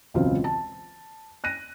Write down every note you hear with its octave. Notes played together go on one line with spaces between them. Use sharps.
E1 C#2 F#3 C4 F4
A5
F#6 A#6 D#7